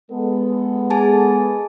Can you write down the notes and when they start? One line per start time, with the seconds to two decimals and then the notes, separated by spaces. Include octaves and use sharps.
0.11 G#3 B3 A4
0.90 G#4 G#5 A5